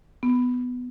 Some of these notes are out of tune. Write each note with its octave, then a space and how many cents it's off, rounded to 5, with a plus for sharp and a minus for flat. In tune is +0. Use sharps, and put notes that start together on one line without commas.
B3 +10